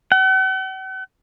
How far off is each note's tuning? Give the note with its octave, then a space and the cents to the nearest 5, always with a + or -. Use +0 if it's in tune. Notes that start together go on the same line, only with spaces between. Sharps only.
F#5 +45